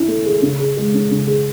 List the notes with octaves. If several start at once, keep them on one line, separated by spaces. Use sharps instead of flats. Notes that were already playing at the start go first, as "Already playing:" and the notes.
Already playing: C#4 E4
A3
G#4
C#3
G#4
G#3
C#4
C#3
G#4